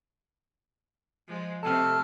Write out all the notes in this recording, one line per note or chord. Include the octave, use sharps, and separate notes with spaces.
F3 G#3
C3 A3 C4 A4 A5 F6